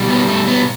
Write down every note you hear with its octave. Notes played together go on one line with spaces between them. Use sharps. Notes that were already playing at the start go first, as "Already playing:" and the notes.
Already playing: B2 G3
B3
A3
B3